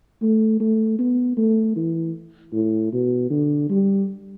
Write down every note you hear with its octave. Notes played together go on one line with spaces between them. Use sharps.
A3
A3
B3
A3
E3
A2
B2
D3
G3